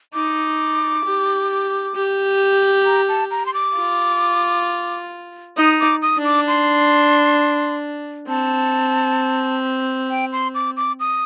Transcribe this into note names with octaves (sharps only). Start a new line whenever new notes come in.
D#4 D6
G4
G4
A#5
A5
A#5
C6
D6
F4
D#4 D#6
D6
D#6
D4
D6
C6
C4 A5
G5
C6
D6
D6
D#6